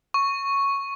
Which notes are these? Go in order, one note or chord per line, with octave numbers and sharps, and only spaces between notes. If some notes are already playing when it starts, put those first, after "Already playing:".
C#6